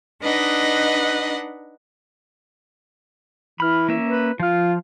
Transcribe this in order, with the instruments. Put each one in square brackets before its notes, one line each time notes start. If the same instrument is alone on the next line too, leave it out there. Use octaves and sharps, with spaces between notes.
[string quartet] D4 D#4 B4 D#5 F#5
[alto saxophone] E3 [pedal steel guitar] B5 F6
[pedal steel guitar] A#3 C#4 E5
[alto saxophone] B4
[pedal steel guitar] F3 F6 [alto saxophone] F4